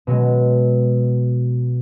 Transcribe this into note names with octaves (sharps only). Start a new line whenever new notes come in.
B2 F#3 G#3